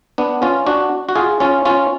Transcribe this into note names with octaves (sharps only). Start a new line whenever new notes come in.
B3 D4
C#4 F4
D4 F#4
F#4
F4 G#4
C#4 F4
C#4 F4